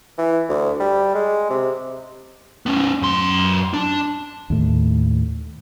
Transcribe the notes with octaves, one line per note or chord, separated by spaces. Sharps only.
E3
D2
G3
G#3
C3
B3 C#4
F#2 C6
D4
D#2 A2